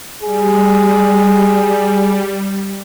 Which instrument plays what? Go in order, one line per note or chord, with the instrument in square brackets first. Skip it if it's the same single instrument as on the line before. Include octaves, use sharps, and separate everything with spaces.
[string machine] G3 [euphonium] G#4